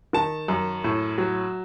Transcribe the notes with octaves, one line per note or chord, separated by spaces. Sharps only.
D#3 A5
F#2
A2
F#3